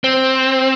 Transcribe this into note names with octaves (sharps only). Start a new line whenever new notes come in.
C4